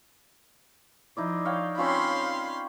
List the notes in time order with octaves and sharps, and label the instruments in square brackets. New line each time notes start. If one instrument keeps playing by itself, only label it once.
[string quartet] F3 [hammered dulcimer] D#4 E4 D5
[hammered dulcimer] C#5 F5 G5
[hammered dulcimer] C4 C#4 F4 [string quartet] F5 B5 C6